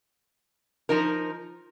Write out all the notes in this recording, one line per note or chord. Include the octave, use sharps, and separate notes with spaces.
F3 D#4 A#4